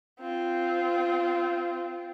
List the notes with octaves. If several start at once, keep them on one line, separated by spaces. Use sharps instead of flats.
C4 F4